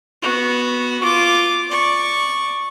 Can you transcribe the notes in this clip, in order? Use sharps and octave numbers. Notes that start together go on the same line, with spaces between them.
B3 F#4
F4 D6
D5 C#6